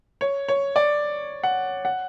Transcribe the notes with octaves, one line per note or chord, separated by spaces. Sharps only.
C#5
C#5
D5
F#5
F#5